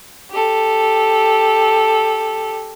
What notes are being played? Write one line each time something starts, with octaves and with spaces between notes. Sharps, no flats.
G4 A4